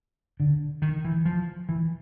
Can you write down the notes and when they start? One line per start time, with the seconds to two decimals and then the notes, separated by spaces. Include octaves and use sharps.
0.40 D3
0.82 D#3
1.05 E3
1.25 F3
1.69 E3